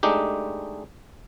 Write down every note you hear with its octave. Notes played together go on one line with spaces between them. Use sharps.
G#3 A3 D4 D#4 G4